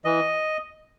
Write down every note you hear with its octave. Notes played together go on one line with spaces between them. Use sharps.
E3 D#5